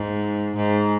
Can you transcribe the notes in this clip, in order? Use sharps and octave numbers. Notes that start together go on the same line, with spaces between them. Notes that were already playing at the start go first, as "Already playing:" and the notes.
Already playing: G#2
G#2